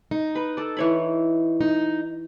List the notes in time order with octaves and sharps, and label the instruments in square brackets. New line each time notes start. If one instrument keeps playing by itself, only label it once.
[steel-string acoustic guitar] D#4
[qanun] B4
A4 D5
E3 C#5 B5
[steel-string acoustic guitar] D#4